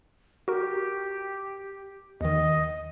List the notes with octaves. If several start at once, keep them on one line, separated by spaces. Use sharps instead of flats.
F#4 G4 A#4
D#2 D#3 D#5